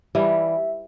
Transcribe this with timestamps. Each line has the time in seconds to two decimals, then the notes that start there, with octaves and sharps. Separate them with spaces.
0.15 E3 G3 E5